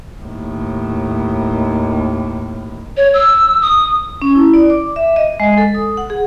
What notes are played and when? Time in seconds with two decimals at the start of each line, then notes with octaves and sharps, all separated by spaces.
0.21 D#2 A2
2.97 C#5
3.14 E6
3.62 D#6
4.22 C#4
4.35 E4
4.54 D5
4.70 D6
4.96 E5
5.16 D#5
5.40 G#3
5.58 A4
5.74 D#6
5.97 F#5
6.10 G#4